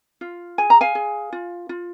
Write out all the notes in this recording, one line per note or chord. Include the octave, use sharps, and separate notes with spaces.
F4
G#4 G#5
A#5
F5 G#5
G#4
F4
F4